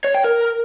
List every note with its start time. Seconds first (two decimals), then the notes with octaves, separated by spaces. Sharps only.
0.04 C#5
0.14 G5
0.24 A#4